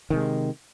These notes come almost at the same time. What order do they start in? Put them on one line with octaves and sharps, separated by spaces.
D#3 C3 G#3